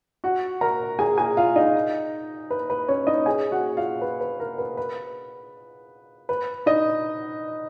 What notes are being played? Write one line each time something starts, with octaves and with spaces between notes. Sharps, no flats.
F#4 F#5
A#4 A#5
G#4 G#5
G#4 G#5
F4 F5
D#4 D#5
B4
B4
C#4 C#5
D#4 D#5
G#4 G#5
F#4 F#5
F4 F5
B4
B4
A#4
B4
B4
B4
D#4 D#5